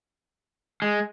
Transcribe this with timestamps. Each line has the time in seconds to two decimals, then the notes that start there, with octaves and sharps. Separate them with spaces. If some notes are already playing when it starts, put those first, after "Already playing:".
0.82 G#3